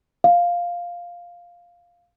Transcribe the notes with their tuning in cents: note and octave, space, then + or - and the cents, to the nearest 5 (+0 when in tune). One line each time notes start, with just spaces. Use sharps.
F5 +0